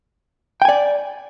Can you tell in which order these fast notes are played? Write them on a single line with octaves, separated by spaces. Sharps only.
G5 G#5 D5